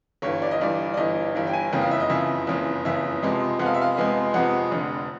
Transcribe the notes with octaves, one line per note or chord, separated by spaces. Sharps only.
G1 G2 E3 C#5
D5
D#5
G1 G2 E3 D5
D5
G1 G2 E3 D#5
G1 G2 E3
G5
G#5
F#1 F2 C#3 E3 G5
F5
E5
D#5
F#1 F2 C#3 E3 E5
F#1 F2 C#3 E3
F#1 F2 C#3 E3 E5
F2 C3 F3 G#3 B3
F2 C3 F3 G#3 B3 F#5
F5
E5
F5
F2 C3 F3 G#3 B3
F2 C3 F3 G#3 B3 F#5
F1 F2 D3